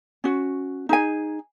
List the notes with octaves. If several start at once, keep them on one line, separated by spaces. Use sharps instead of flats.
C#4 F#4
D#4 G#4 G#5